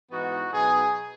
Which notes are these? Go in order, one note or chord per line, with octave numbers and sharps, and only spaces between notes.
G#2 E3 B3 D#4 F#4
B2 F#3 B3 D#4 G#4